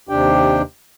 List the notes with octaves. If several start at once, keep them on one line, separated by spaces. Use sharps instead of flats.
D#2 C3 D4 G4 G5